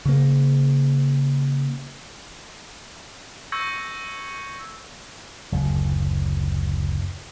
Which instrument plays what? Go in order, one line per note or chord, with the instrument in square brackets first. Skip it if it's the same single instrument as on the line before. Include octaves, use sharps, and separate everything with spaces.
[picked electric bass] C#3 A#3
[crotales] C#6 E6 G6 G#6 A#6 C#7
[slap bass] F#1 D2